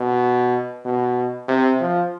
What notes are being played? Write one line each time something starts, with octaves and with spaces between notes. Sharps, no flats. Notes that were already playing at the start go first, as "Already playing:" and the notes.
Already playing: B2
B2
C3
F3